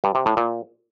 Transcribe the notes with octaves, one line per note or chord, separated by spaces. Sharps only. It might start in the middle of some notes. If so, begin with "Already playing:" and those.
G2
C3
A2
A#2